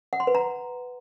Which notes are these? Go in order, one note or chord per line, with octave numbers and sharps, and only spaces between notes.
F#5
C6
B4
A#5